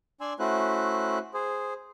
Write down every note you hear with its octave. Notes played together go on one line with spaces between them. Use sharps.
D4 D5 G#5 C6 E6
A3 C#4 E4 F#4 C5 F#6
G#4 C5